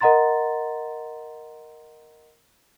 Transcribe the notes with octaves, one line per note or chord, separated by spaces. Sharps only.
A#4 D#5 F#5 A#5 C6 A6